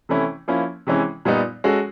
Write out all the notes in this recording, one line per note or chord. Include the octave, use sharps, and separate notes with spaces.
C3 E3 A3 C#4 E4
F3 A#3 C#4 E4
C3 E3 G#3 C#4 E4
A#2 G3 B3 D#4
G#3 C#4 F#4 A4